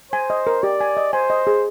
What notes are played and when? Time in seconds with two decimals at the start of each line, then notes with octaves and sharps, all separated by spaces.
0.12 C5 G#5
0.30 D#5
0.47 A#4
0.63 G4 D5
0.81 G#5
0.97 D#5
1.13 C5 G#5
1.30 D#5
1.47 G#4